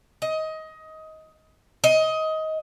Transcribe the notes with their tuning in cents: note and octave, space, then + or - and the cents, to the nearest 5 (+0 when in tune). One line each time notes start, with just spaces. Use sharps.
D#5 +20
D#5 +20